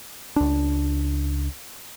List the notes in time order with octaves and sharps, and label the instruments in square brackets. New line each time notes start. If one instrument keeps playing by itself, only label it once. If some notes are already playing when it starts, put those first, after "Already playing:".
[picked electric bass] C#2 D4